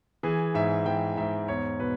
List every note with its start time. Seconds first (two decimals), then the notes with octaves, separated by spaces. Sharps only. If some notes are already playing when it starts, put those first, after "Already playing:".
0.23 E3 G#4
0.54 G#2 E5
0.86 E3 G5
1.17 G#2 E5
1.48 E2 C#5
1.79 B2 B4